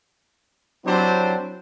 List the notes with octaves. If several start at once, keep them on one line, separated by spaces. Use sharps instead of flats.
F#3 C4 D4 E4 G4 C5